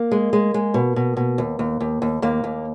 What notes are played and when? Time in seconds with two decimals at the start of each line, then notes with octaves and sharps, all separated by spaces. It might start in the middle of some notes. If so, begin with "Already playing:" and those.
Already playing: A#3
0.12 G#3
0.33 G#3
0.54 G#3
0.74 B2
0.96 B2
1.17 B2
1.38 D#2
1.59 D#2
1.81 D#2
2.02 D#2
2.22 D#2 A#3
2.44 D#2